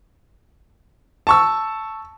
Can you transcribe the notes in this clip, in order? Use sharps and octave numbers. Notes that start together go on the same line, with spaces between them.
A5 C#6 E6